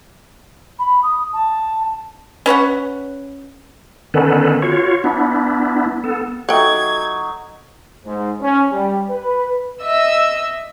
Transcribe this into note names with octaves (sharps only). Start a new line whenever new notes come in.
B5
D#6
A5
C#4 B4 C#5 F#5
D3 D#3 B3 C#4 A4 B4
F4 F#4 C#5
B3 D4 E4
B3 A4
F#3 D#4 A4 D#5 E5 F#5 G5 G#6
G#2
C#4
G3
B4
D#5 E5 E6